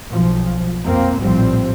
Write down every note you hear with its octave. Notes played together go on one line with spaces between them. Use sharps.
B1 F3
F2 A#3 C4
A#1 A2 F3 G3 C4